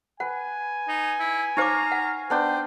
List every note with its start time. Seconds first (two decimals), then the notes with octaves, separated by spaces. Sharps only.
0.20 B4 F#5 G#5
0.88 D#4
1.20 E4
1.57 D#4 C5 C#5 F5 A#5 D6
1.92 F#5
2.30 B3 D4 C5 G5